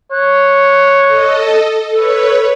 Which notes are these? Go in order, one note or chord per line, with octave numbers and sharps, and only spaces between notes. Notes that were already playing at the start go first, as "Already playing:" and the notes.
C#5 F#6
A4 D#5
A4 B4 C#5